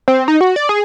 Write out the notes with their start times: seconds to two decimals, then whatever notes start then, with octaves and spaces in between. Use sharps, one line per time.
0.08 C4
0.28 D#4
0.41 F#4
0.56 D5
0.69 G#4